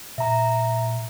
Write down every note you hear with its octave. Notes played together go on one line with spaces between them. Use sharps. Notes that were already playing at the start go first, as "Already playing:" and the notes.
A#2 E5 A#5